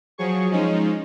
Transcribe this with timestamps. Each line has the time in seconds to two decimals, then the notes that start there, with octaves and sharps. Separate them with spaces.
0.18 F3 F#3 G#4 C#6
0.51 F3 G#3 C#4 D#4